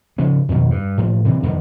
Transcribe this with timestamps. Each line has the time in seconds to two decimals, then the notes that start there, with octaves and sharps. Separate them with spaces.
0.18 C#3 F3 B3
0.49 F2 B2 D#3
0.71 G2
0.98 A2 F3
1.25 C3 E3
1.43 F2 D3 D#3 B3